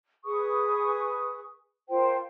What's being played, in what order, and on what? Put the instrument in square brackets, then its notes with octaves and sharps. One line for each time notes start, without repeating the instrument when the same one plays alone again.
[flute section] G#4 B4 C#6 D#6
F4 A#4 C5 G5